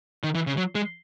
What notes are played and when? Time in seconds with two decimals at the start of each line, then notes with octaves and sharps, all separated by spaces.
0.24 D#3
0.35 E3
0.47 C#3
0.57 F#3
0.75 G#3